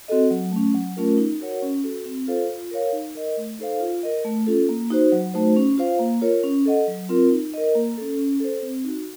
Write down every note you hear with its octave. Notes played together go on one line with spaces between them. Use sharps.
C4 F#4 A4 D#5
F#3
A3 C#4
F#3
A3 C#4 F4 A#4
D#4
F#4 A#4 C#5 F#5
C#4
F#4 A4
C4
F4 A4 C5 F5
F4
A#4 C#5 F5
D#4
A#4 D#5
A3
D#4 A4 C5 F5
F4
A#4 D#5
A3
C#4 F4 A4
A#3
D#4 F#4 C5
F#3
A3 D#4 F#4 C5
C#4
F4 C5 F5
A#3
F4 A#4 C#5
C#4
A4 D#5 F#5
F#3
C4 F4 A#4
D#4
A#4 D#5
A#3
C#4 A4
C#4
A4 C5
C4
D#4 F#4